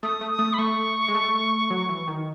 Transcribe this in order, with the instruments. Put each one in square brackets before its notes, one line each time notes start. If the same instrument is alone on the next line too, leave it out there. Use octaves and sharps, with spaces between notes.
[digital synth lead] A3 [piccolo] D#6
[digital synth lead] A3
[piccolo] D#6
[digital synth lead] A3
[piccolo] B5
[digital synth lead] A3 [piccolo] C#6
[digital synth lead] G#3
A3
F#3
E3
D#3